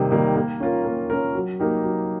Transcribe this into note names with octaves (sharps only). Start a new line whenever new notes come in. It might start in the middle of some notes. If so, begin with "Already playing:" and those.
Already playing: C3 D#3 G3 A#3 D#4
D#3 G3 A#3 D#4
A#3
C#4 F4 A#4
A#3
C#4 F4 A#4
F#3
A#3 D#4 G4 A#4
F#3